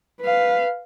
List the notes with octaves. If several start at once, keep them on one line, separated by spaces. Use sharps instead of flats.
B4 F5